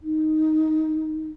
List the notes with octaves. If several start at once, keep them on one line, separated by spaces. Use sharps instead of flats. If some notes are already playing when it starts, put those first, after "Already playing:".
D#4